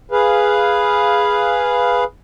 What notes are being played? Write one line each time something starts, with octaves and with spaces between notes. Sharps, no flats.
G#4 B4 F5